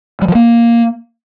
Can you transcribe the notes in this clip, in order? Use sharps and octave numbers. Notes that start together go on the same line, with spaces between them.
G3
F3
A#3